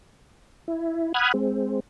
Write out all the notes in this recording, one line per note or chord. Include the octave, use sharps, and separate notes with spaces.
E4
F#5 B5 D#6 F6 F#6 G#6
G#3 C4